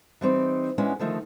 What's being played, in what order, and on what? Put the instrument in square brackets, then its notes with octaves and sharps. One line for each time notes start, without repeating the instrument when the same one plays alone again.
[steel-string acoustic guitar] E3 G3 C4 D#4
G#3 B3 C#4 D4 E4
D3 D#3 F3 A3 D#4